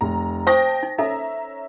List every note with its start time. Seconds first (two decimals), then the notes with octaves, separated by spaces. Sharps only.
0.01 F1 A#5
0.47 C5 G5 A5 C#6 D#6 A#6
0.83 D#4
0.98 C#4 D#4 A4 E5 A#5